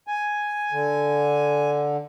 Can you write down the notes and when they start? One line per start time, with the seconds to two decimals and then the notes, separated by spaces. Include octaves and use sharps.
0.07 G#5
0.72 D3